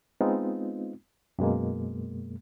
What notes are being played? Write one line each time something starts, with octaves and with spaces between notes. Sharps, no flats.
G#3 B3 C4 D#4 F4
F#2 B2 G#3 A#3